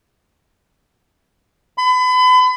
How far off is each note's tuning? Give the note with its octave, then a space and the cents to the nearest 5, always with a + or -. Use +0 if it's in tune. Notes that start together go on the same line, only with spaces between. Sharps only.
B5 +35